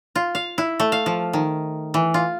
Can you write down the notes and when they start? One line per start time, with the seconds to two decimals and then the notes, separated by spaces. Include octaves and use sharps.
0.16 F4
0.35 F5
0.58 E4
0.80 A3
0.92 F5
1.06 F3
1.33 D#3
1.94 E3
2.14 F4